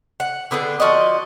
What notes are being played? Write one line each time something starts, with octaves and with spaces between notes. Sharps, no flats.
F#5
D3 B3 G#4 G5
F3 F#4 D5 D#5